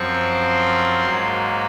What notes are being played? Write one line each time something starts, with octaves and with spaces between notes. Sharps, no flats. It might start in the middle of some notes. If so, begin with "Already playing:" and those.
Already playing: F#2 F3 C4 C#6
C6
G#2 F#3 A#3